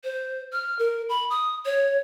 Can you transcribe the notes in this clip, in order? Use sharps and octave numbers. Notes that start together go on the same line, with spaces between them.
C5
F6
A#4
B5
D#6
C#5